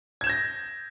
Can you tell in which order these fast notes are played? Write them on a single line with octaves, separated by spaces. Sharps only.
G#6 E7 G6 A#6